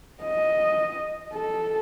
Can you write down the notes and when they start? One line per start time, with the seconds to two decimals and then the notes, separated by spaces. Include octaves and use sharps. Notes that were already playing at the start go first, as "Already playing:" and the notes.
0.24 D#5
1.33 A4